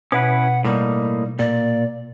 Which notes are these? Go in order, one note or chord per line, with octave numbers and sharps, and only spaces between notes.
B2 C#4 E4 B4 F#5
A2 G3 A#3 D#4
A#2 D5